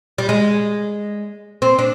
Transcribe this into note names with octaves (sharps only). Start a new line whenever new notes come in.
G3
G#3
C4
D4